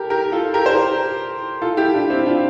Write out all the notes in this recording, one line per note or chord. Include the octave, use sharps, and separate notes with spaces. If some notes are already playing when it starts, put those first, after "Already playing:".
Already playing: G4 A4 A#4
G4 A#4
F4 A4
G4 A#4
C5
G4 A#4
F4 A4
E4 G4
D4 F4
C4 E4
D4 F4